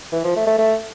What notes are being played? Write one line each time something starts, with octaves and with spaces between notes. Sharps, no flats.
E3
F3
A3
A3
A3